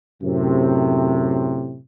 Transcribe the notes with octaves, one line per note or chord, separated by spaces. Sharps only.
F#2 A2 C3